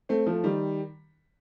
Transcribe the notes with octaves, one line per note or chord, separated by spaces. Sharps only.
A3 C4
F3 A3
D#3 G3